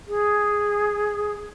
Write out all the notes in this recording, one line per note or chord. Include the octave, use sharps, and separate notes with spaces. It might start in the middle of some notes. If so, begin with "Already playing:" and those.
G#4